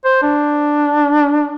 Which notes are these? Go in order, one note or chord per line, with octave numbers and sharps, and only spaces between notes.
C5
D4